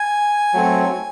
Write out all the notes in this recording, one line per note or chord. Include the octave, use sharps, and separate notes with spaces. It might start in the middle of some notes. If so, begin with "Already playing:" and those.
Already playing: G#5
F#3 A3 C4